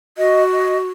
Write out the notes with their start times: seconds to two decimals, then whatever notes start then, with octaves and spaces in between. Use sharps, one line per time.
0.18 F#4 D#5
0.52 D#5